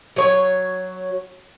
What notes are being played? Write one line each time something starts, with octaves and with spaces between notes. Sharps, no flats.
F#3 C#5